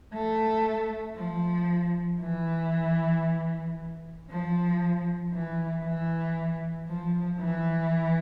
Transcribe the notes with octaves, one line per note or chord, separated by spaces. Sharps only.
A3
F3
E3
F3
E3
E3
F3
E3